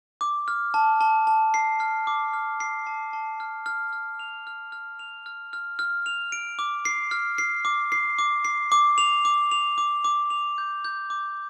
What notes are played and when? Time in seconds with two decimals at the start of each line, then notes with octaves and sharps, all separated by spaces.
0.21 D6
0.48 F6
0.74 A5
1.01 A5
1.27 A5
1.54 C7
1.80 F6
2.07 D6
2.33 F6
2.60 C7
2.87 A5
3.13 A5
3.40 F6
3.66 F6
3.93 F6
4.19 F7
4.47 F6
4.72 F6
4.99 F7
5.26 F6
5.53 F6
5.79 F6
6.06 F7
6.32 D7
6.59 D6
6.85 C7
7.11 F6
7.38 C7
7.65 D6
7.92 C7
8.19 D6
8.45 C7
8.72 D6
8.98 F7
9.25 D6
9.52 F7
9.78 D6
10.05 D6
10.30 F7
10.58 G6
10.84 G6
11.10 D6